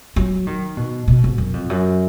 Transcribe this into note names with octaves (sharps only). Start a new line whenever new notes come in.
F#3
D#3
B2
B2
G#2
F#2
F2
F#2